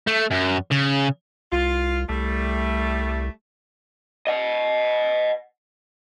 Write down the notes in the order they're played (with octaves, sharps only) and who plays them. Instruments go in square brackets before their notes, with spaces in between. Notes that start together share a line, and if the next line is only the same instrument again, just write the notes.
[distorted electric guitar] A3
F#2
C#3
[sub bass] C2 [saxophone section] F4
[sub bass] C2 [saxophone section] G3 A3
[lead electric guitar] D#5 F#5